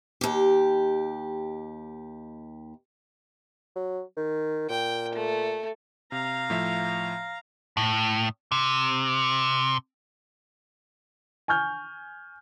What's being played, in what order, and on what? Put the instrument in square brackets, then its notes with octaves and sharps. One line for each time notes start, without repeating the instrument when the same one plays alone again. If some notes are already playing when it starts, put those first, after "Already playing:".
[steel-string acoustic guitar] D#2 G4
[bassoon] F#3
D#3
[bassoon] A#2 [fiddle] G5
[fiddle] A3
[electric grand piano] C3 [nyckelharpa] F5 A#5
[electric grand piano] A2 F3 E5
[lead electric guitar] A2
C3
[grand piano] G#5 C#6 F6 G6